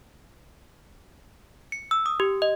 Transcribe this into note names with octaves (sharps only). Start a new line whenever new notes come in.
C#7
E6
D#6
G4
D#5